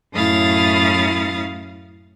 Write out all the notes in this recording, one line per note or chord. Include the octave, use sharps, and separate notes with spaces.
F#2 A2 E4 F5 D#6 A6